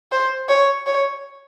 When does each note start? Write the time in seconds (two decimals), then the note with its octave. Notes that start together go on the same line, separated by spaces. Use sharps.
0.12 C5
0.49 C#5
0.86 C#5